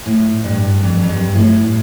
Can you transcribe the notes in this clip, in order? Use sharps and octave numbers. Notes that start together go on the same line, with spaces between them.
A2
G2
F2
F2
G2
A2